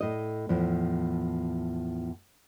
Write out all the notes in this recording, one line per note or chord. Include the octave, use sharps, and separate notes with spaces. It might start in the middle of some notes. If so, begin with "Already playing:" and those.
A2 D#5
E2 A2 F3